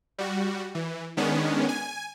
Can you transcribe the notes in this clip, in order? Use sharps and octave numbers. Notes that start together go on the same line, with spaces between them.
G3 F#4
E3
D#3 G#3 B3 C#4 D4
G#5